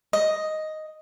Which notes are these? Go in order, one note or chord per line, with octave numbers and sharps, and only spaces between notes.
D#5